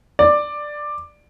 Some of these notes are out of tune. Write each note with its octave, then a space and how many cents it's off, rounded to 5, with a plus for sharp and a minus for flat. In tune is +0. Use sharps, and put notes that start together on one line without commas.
D5 +10